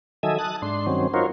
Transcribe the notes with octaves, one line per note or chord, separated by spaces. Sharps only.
D#3 F#3 A4 D#5 E5 G#5
A5 D#6 F#6
G#2 D4 C6
G2 D#3 F#3 C4 C#4
D#4 F4 F#4 A#4 C5 C#5